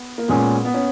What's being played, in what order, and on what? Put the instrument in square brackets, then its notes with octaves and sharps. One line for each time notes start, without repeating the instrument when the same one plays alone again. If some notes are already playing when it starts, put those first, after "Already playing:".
Already playing: [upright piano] B3
A#3
[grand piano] A#2 G#3 C#4 G#4 [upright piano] B3
[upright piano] B3
C#4